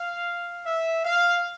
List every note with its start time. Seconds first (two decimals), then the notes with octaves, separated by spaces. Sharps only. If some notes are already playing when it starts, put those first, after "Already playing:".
Already playing: F5
0.66 E5
1.05 F5